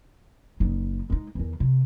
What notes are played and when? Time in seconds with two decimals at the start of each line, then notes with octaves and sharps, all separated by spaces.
0.60 F#1 D#4
1.10 G#3 D#4
1.35 E2 D#3
1.60 C3